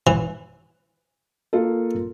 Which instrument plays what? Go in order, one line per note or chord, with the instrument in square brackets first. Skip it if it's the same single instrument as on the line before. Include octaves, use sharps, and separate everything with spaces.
[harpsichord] E3
[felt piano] A#3 F4 A4